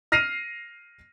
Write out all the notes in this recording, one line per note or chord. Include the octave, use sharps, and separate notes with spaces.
F6 A#6 C7 D#7 F7